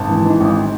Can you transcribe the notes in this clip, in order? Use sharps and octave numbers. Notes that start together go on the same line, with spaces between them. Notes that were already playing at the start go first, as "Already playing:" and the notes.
Already playing: G#1 A5
E3
G#2
G#1